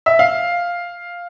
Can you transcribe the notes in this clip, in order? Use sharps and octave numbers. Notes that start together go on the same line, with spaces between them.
E5
F5